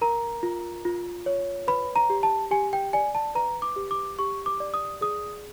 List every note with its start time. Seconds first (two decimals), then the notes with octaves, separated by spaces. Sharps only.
0.01 A#4 A#5
0.43 F4
0.85 F4
1.26 C#5
1.68 B4 B5
1.96 A#5
2.10 G4
2.23 A5
2.51 G4 G#5
2.73 G5
2.93 D5 G#5
3.15 A5
3.35 B4 A#5
3.62 D6
3.76 G4
3.91 D6
4.19 G4 C#6
4.46 D6
4.60 D5
4.74 D#6
5.01 G#4 D#6